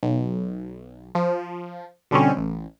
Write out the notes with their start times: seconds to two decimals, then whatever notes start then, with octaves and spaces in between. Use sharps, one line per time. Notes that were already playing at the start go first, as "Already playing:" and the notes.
0.03 B1
1.15 F3
2.11 B2 D3 G3 C4 C#4
2.37 A1